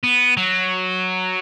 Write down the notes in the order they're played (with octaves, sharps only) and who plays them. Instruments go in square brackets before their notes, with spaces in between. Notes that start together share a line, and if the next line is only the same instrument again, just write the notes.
[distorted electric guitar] B3
F#3